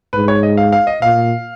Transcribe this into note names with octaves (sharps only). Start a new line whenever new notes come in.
G#2 B4
C#5
D#5
F5
F5
D#5
A#2 F5